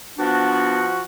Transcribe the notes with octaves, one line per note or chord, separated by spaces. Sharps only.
F3 B3 D4 F#4